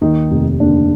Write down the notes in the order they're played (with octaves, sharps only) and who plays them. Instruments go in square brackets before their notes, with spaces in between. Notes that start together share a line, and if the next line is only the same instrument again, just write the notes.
[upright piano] D#2 [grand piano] D#3 D#4
[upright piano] F1
[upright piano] D#2 [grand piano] D3 D4